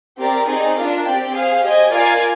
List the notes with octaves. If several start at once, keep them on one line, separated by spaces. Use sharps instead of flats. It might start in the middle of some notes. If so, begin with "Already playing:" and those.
C4 G4 A#4 D5
C4 D#4 G#4 D5
D4 F4 A#4
C4 G4 D5 G5
G#4 C5 F5
G4 C5 D#5 G#5
F4 A#4 D5 F5 G#5